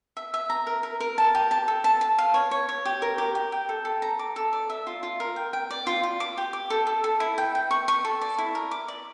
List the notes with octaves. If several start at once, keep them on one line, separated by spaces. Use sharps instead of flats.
E5
E5
A#5
A#4
A#4
A#4
A5
G4
A5
A4
A5
A5
F5
C#5
C#5
C#5
G4
A#4
G4
G4
G5
A4
A4
A#5
D6
A4
D5
E5
F4
F4
A#4
G5
G5
D5
F4
F4
D6
G4
D6
A4
A4
A4
E4
G5
G5
C#6
C#6
A4
D5
E4
A#4
D6
D5